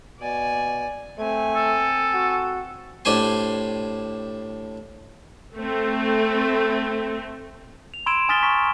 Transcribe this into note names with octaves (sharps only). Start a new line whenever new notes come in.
B2 D5 G#5
A3 C4 G#5
A4
F#4
A2 D4 G4 C5 G#5 C6
A3 C4
F7
B5 C6 E6 G#6 D7 E7
G#5 D#6 F6 A6 B6 G7
A#5 C#6 F6 B6